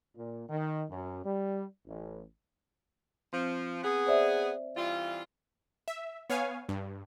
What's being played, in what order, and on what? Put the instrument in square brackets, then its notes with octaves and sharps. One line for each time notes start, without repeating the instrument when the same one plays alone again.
[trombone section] A#2
D#3
F#2
G3
A1
[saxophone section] F3 [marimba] C4
[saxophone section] B3 G#4
[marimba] C5 D5 E5
[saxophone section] E3 G3 F4
[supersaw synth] E5
B3 C#5 F5 G#5
G2